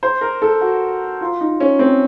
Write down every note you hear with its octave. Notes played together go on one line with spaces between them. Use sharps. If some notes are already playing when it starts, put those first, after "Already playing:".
C5
A#4
A4
F#4
F4
D#4
C#4
C4